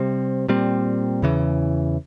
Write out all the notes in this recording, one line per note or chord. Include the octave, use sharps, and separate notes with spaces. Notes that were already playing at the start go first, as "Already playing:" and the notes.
Already playing: C3 G3 C4
A#2 G3 C4
E2 C#3 E3